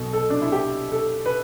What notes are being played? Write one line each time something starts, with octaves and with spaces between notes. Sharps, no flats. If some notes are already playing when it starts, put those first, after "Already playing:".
Already playing: B1 B2 A4
A4
D4
E4
G4
A4
B4